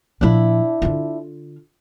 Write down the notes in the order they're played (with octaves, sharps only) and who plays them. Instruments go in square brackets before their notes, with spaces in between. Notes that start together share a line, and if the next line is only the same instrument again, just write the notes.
[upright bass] A#2 F3 [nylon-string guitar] D4 E4
[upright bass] D3 F4